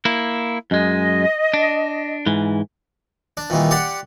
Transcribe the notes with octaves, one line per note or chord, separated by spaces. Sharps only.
A#3 E4
F#2 G#3 D#5
D4
G#2 E3
D4
A#2 D#3 E3 G3
G4 D5 F#5 C6